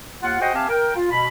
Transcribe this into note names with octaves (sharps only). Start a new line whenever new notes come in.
D#2 F4 F#5
F#4 G#4 C5 D#5 F#5 G5
C4 G4 E5 F5 G#5 A5
A#4 G5
F4
B2 B5